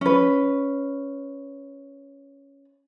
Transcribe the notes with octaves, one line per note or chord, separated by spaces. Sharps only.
C#4 B4